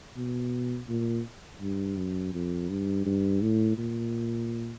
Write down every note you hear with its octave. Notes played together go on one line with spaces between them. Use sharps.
B2
A#2
G2
F#2
F2
G2
G2
A2
A#2